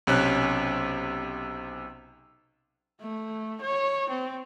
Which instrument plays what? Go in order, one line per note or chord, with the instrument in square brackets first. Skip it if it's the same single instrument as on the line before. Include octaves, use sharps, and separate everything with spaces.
[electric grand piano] B1 C3 C#4 F#6
[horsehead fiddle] A3
C#5
C4